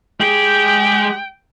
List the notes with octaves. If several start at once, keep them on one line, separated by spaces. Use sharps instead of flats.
G#3 G4 G#4 G5